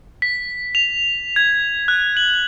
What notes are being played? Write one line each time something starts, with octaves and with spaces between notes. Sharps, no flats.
B6
F7
G#6
F#6
F#7